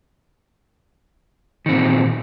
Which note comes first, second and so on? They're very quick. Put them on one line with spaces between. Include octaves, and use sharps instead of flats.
D#3 C4 A#2